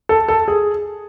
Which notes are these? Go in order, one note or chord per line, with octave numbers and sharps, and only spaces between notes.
A4
A4
G#4